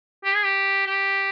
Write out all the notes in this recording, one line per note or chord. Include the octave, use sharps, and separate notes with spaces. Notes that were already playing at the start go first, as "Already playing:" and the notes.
G4
G#4
G4
G4